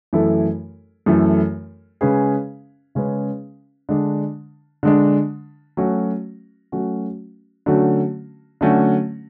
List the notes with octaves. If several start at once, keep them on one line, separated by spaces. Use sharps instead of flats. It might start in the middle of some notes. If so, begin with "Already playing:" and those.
F#2 E3 A3 E4 A4
F#2 E3 A3 E4 A4
C#3 G#3 C#4 G#4 B4
C#3 G#3 C#4 G#4 B4
D3 G#3 D4
D3 G#3 D4
F#3 A3 C#4 F#4
F#3 A3 C#4 F#4
D3 F#3 A3 C#4 F#4
D3 F#3 A3 C#4 F#4